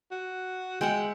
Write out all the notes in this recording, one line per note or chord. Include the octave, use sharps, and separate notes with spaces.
F#4
G#3 E5 F#5 G5